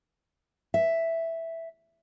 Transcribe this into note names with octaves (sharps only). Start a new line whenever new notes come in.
E5